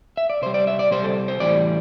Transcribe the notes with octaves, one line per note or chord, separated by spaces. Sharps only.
E5
D5
C3 G3 C5
D5
E5
D5
C3 G3 C5
A4
C5
A2 E3 G3 D5